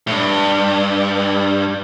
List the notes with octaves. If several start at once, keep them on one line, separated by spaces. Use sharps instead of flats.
A2
G2